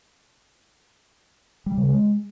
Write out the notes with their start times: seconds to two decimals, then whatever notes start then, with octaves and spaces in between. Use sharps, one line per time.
1.66 G3
1.77 C#3
1.89 G#3